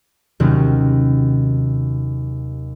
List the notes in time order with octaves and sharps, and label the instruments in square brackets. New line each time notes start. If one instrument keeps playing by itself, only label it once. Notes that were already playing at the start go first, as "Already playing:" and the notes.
[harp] D#2 C3 D#3 F#3 C#4